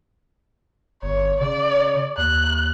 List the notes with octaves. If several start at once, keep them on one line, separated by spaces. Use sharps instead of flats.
G1 C#5
C#3 D5
D#2 F#6